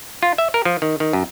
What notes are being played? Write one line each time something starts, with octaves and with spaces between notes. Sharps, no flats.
F4
E5
A#4
F3
D#3
D#3
F#2